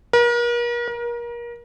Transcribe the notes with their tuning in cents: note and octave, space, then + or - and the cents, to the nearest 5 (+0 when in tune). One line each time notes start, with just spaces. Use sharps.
A#4 +40
A#4 +30